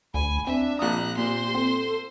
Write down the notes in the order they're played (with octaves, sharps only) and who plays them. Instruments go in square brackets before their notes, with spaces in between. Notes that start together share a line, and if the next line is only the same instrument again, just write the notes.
[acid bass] D2 [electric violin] G#5 [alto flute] B5
[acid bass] C4 [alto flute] D4 [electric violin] E5
[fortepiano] A#1 D#6 [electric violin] A#5 F#6
[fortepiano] A#2 [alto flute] G4 [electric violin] C5 C6
[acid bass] C4 [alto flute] A4